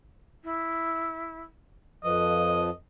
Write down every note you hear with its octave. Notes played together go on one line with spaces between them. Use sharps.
E4
F2 F3 B4 D#5